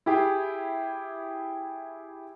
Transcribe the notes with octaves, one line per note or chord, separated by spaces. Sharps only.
E4 G4 G#4